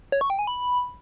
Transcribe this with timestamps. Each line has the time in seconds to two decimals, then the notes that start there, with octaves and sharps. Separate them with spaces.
0.12 C#5
0.21 C#6
0.30 G5
0.39 G#5
0.47 B5